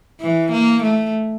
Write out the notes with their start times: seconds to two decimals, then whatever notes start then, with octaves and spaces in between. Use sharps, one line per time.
0.20 E3
0.51 A#3
0.83 A3